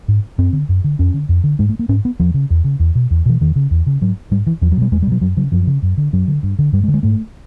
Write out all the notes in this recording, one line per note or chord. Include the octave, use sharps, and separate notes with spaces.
G#2
F#2 C4
D3
F#2
D3
F2 C#4
D3
F2
D3
G#2 G#3
A3
A#3
G#2 C#4
B3
E2 F3
C#3
E2
C#3
E2
B2
E2
B2 E3
E2 D#3
C#3
E2
C#3
G#2 F#3
G#2 G3
E3
E2 F3
F#3
B2 G3
E2 G#3
G3
B2 F#3
F#2 F#3
C#3 F#3
F#2 F3
C#3
F#2
D3
F#2 F#3
D3
G2
D3
G2 G3
G#3
D3
G#3
G#2 A3